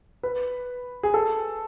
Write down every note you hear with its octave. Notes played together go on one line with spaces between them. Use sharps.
B4
G#4
A4